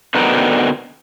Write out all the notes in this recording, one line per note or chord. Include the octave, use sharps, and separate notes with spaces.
D3 B3 C4 D#4 F#4 A#4